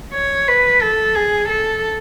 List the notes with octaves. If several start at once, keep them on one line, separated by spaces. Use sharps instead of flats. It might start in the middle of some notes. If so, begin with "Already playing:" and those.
C#5
B4
A4
G#4
A4